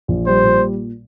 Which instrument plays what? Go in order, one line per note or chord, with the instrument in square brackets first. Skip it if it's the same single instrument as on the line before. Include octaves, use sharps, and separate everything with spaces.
[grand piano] A#1
[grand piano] G3 [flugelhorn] C5
[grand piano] A#2